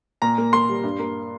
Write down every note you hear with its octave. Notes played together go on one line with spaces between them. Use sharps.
A#2 A#5
A#3
A#3 C6
G3
G2
A#3